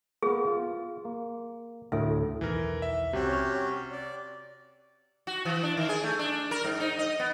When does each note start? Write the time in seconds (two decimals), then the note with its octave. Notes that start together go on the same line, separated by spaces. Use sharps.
0.22 A#3 B3 G#4
0.47 F4
1.05 A#3
1.92 D2 A2 A4 E5
2.41 B1 E2 D#3 E3 A#4
2.82 E5
3.13 C2 C3 C#4 F#4 G4
3.29 C#5 F6
3.92 D5
5.27 F#4
5.45 E3
5.63 D4
5.77 D#3
5.89 G#4
6.03 A3
6.19 D4
6.51 A#4
6.65 G#2
6.80 D#4
6.99 D#5
7.19 B3